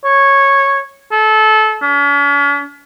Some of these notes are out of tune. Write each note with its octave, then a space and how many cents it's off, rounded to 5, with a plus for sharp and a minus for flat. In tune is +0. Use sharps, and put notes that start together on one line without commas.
C#5 -10
A4 -25
C#4 +45